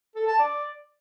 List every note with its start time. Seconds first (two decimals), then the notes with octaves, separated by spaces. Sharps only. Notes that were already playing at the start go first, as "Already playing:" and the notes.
0.16 A4
0.27 A5
0.39 D5